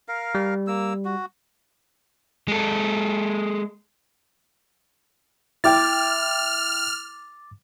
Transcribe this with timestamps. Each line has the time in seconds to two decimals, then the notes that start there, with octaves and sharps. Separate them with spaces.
0.08 A#4 F5
0.35 G3
0.67 A#3 E6
1.05 F#4
2.48 G#3 A4
5.64 E4 G5 D6 F6 A6